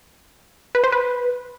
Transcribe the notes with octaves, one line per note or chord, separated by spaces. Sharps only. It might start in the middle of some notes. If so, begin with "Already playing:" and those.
B4
C5
B4